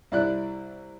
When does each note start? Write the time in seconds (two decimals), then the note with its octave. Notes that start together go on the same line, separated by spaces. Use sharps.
0.12 C2 E4 D5 F#6